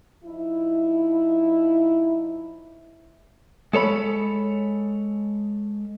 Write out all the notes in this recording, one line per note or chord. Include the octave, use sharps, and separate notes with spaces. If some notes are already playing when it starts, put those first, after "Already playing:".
F3 D#4 E4
G#3 A4 C#5 B5